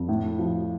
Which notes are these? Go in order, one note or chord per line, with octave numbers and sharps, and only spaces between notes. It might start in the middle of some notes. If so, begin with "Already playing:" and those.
Already playing: F2
A2
F3